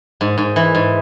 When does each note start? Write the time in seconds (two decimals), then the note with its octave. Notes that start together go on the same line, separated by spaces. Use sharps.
0.21 G#2
0.38 G#2
0.56 E3
0.75 G#2